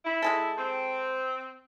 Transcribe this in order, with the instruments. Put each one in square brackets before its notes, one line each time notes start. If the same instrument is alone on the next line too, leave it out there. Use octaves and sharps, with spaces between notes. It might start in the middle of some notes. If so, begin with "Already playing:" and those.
[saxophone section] E4
[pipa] G#3 G#4 A4
[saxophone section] C4